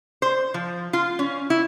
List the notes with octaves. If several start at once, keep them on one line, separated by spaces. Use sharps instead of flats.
C5
F3
F4
C#4
E4